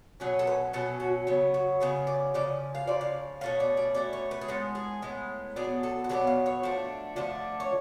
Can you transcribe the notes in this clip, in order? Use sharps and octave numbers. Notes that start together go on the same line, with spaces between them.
B2 F#3 C#4 G#4
A4
B4
B2 F#3 C#4 A4
F#4
C#3 F#3 B3
F#4
C#3 F#3 B3 G#4
D5
C#3 F3 D5
F5
C#3 F3 D5
F5
B2 A3 C#4 F5
D5
D5
B2 A3 C#4 D5
C#5
B4
G#4
A2 G#3 B3 A4
G#4
A2 G#3 B3
B2 F#3 B3 D4 G#4
A4
F#4
B2 F#3 B3 D4 G#4
F5
C#5
D3 F3 A3 D4
D3 F3 A3 D4
C#5